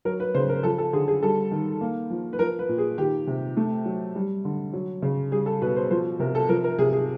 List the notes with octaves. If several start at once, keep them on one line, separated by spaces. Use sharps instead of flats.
F#3 A#4
B4
C#3 C5
A#4
F3 A4
A4
D3 G#4
G#4
G3 A4
D#3
A#3
F3
B4
F3 A#4
B4
A#2
G#4
D#3 G4
C3
A3
F#3
G3
D3
F#3
C#3
G3 G#4
A4
B2 B4
C5
F3 C5
C3 A#4
A4
F3 A#4
A#4
C3 G#4
G#4